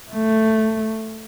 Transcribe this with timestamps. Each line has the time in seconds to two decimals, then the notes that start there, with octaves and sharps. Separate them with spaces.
0.11 A3